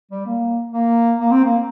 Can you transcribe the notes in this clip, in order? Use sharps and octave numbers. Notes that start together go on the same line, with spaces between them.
G3
A#3
A#3
A#3
C4
A#3